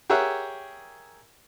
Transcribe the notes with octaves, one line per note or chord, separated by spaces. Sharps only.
G4 G#4 A#4 C#5 E5 F#5